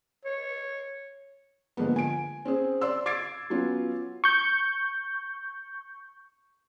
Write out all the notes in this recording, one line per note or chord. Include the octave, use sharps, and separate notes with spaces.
C#5
D3 F3 G#3 A#3 B3
G#5 D7
C4 C#4 G#4 C5
D5 C6 E6
D6 G#6 A6 C7 D7
F#3 B3 C#4 F4
C#6 G6